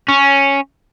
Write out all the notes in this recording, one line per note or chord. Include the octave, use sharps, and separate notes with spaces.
C#4